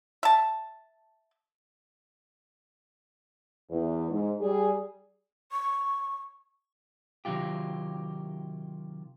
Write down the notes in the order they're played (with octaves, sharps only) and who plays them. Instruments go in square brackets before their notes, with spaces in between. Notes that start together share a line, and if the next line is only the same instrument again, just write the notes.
[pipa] E5 A5
[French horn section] E2
G#2
G3 G#4
[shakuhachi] C#6
[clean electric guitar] C3 D#3 F#3 F4 G4